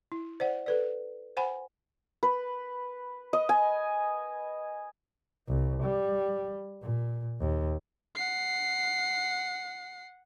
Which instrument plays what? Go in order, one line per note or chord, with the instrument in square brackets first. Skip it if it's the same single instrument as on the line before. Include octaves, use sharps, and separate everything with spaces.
[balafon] E4
C5 D5 F#5
A4 B4 D5
C5 F#5 G#5 B5
[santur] B4
D#5
G#5
[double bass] C2
G3
A#2
D#2
[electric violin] F#5 C7